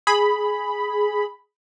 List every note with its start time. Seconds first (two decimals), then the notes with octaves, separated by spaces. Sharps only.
0.07 G#4 B5